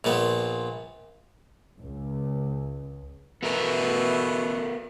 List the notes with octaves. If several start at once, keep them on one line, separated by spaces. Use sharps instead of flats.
A#1 A#2 B3
C#2
B2 E3 A3 B3 F#4 A#4